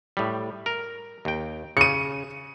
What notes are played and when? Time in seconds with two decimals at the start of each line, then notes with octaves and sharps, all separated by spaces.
0.17 A2 G3
0.66 A#4
1.25 D#2 G5
1.77 C#3 C#7 D#7